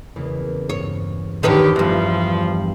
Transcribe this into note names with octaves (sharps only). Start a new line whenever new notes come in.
E2 C#3 A#3
G2 C#5
A#1 E2 D3 D#3 G4 B4 C#5
E2 G2 F3 A#5